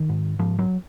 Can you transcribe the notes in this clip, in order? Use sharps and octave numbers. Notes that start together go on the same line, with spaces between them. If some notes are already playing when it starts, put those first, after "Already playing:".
Already playing: D#3
G#2
G#2 F3
F#3